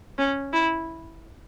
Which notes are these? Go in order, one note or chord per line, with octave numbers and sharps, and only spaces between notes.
C#4
E4